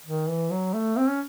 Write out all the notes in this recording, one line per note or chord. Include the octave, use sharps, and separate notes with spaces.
D#3
E3
F#3
A3
C4
C#4